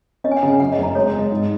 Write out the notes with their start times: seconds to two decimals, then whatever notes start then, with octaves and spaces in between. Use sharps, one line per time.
0.24 C#4 D#5
0.31 G#5
0.36 F#5
0.43 C#3 G#5
0.60 F#2 F#5
0.72 D#5
0.78 F#1
0.83 A#5
0.95 G#3 C#5
1.14 G#3
1.19 D#5
1.32 G#2